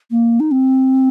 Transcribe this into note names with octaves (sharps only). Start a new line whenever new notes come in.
A#3
D#4
C4